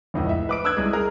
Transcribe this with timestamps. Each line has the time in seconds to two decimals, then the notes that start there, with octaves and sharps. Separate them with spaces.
0.14 F1 C#2 A2 D#5
0.29 E5
0.49 B4 D6 D7
0.64 D#6 E6 F#6 G#6
0.77 C2 G#3
0.93 G#4 A#4